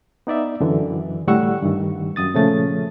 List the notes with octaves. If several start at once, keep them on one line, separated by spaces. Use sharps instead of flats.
B3 D#4 D5 E5
F#2 D3 E3
D2 A2 G3 F#5 C#6 E6
G2 D#3
F#2 D#6 A6
A#2 C#3 F3 A3 C#4 A6